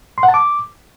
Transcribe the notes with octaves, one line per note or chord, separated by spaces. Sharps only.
C6
F#5
A5
D6